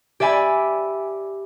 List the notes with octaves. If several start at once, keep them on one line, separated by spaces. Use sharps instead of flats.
G4 D5 E5 G#5 B5